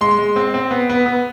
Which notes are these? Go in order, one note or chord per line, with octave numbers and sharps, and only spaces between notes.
G#3 C6
G#3
C4
C4
B3
B3
B3